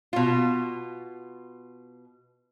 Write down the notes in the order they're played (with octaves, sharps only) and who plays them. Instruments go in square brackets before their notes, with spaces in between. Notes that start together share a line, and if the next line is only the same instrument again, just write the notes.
[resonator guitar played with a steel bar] B2 F4